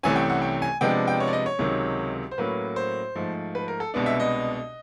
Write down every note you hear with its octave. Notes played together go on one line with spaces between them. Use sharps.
C2 C3 E3 A3 C#4 G#5
G5
F#5
G5
G#5
C3 F3 G#3 B3 D4 G5
G5
C#5
D5
D#5
C#5
C#2 C3 D#3 F#3
C5
A2 F#3 A#3 C#4 B4
C5
G#2 F3 A3
B4
A#4
A4
C2 B2 G#3 B3 D4
E5
D#5